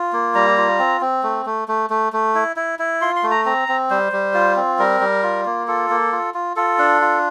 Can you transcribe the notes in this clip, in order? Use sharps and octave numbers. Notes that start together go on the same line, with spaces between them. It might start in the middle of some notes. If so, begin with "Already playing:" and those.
Already playing: F4
A#3
G3 A#5
F4
C4
C4
A3
A3
A3
A3
A3
E4
E4
E4
F4 C6
C6
A3
A#5
C4 A#5
C4
G3 C5
G3
F4
C4
G3 A#4
G3
F4
A#3
F4 A4
A#3
F4
F4
F4 A4
D4
F4